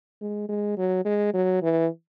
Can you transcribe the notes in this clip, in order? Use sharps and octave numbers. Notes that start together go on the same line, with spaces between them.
G#3
G#3
F#3
G#3
F#3
E3